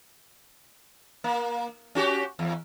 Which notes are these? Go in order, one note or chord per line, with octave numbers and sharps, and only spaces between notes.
A#3
C#4 F#4 G4
E2